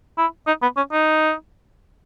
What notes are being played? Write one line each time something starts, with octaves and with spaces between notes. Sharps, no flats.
E4
D#4
B3
C#4
D#4